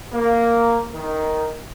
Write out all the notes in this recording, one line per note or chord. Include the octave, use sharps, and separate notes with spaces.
A#3
D#3